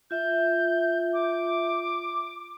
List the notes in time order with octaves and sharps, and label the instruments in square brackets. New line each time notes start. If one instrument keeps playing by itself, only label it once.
[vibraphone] F4 E5 [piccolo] G6
[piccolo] D6